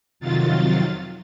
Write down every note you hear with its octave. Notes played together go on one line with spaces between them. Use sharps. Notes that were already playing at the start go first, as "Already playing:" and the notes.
F2 C3 D#3 F#3 F4 A6